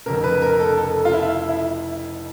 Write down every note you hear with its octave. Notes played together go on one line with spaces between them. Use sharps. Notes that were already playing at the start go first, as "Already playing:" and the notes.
F1 F2 C#3 A#4
B4
A#4
A4
A4
F4
E4
E4